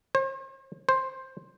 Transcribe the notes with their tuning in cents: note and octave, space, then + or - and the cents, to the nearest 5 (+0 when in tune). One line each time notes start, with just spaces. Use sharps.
C5 +45
C5 +10